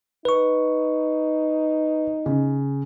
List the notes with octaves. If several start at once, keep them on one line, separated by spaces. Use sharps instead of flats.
D#4 B4 C#6
C#3